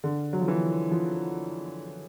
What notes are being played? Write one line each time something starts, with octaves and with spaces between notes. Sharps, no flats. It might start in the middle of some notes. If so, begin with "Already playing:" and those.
D3
F#3
F3
E3
F3